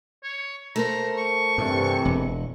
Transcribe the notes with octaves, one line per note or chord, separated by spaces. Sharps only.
C#5
A3 A#4 C5 A#5
C#6
G2 C3 E3
E1